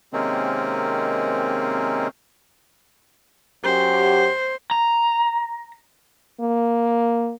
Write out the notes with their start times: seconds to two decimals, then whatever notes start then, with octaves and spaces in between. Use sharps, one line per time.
0.13 C3 D#3 G#3 A#3 C4 C#4
3.64 F#2 G4 C5
4.71 A#5
6.40 A#3